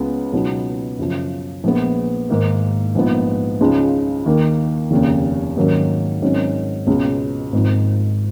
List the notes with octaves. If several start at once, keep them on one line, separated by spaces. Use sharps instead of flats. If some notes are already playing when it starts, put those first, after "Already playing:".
Already playing: C#2 C#3 G#3 B3
C#2 B2 F#3 B3 D#4
F#2 C#3 F3
A#1 A#2 G#3 B3
G#2 D#3 A#3 D#4
A#1 G#2 F3 B3
C#2 C#3 F3 G#3 D#4
D#2 D#3 A#3
F1 D#2 C#3
G#2 D#3 F#3 A#3 C#4
G#1 G#2 F#3 C#4
C#2 B2 G#3 C#4
G#1 G#2 F3